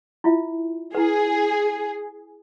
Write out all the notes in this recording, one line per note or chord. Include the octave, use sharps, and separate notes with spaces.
E4 F4 E5
E4 G#4 B4